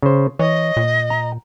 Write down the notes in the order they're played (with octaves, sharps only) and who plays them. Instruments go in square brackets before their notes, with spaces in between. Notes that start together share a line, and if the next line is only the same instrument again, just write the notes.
[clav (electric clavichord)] C#3 C5
[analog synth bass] E3 [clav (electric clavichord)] C#5 [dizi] D#5
[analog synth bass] A#2
[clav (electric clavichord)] A#5